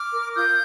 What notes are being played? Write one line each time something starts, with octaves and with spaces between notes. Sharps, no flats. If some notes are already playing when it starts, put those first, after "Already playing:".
Already playing: D6 F6
A#4
F4 D#6 G6